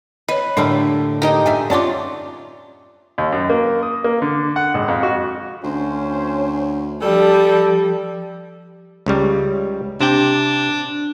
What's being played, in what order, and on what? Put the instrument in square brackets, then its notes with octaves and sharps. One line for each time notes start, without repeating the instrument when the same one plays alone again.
[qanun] B4 [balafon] C#5 D#5
[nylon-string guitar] A2 D3 A3 [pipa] G3 A#3 A4 [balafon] D4
[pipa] A#3 D#5 [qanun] D#4 G4
[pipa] D3 F3 E5 [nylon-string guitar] G#5
[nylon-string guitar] C#4 F4 [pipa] F#4 A5 C6 [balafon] D5 D6
[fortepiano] D#2
F#2
A#3
D#6
A#3
D3
F#5
G#1
F2
F#4
[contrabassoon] D2 [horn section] C#4 C5
[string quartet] F3 [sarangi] G3 [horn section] A4
[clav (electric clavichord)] C#2 C#3 G3
[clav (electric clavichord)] C3 G5 [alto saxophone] D4